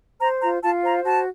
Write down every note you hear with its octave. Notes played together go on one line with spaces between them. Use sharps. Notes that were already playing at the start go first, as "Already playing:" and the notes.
C5 A#5
F4 A#5
F4 A5
C5 A#5
F#4 A5